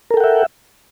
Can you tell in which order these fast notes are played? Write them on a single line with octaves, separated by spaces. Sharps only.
A#4 A4 G5 F#5 E5